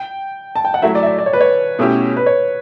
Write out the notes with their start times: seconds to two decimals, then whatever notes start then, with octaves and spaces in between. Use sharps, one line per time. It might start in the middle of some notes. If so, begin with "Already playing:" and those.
Already playing: G5
0.56 A5
0.65 G5
0.74 F#5
0.82 F#3 A3 E4 E5
0.95 D5
1.03 E5
1.06 D5
1.19 D5
1.26 C#5
1.33 B4
1.41 C#5
1.79 B2 A3 C#4 E4 G4
2.17 B4
2.26 C#5